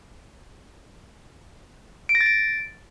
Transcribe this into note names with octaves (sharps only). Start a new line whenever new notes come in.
D7
A#6
A6
D7